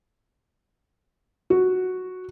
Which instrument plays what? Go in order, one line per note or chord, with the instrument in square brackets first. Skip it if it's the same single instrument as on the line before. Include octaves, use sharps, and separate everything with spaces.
[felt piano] F#4